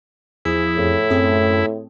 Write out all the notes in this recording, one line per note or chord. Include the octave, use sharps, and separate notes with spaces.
E2 F3 E4 G#4
F2 A2
F#2 A3 C4 G#4